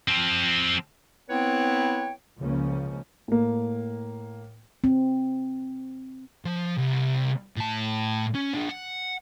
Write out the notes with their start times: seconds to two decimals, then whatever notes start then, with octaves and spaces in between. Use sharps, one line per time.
0.08 F3 C4
1.29 B3 C4 E4 B4 C#5 G5
2.38 C#2 C#3 F3 A#3 C#4
3.28 A2 A#3
4.84 C4
6.45 F3
6.77 C2
7.57 A2 A5
8.35 C#4
8.54 F3 D4
8.69 F#5